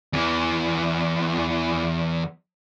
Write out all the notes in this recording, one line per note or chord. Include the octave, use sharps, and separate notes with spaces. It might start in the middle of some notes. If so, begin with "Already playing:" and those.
E2 E3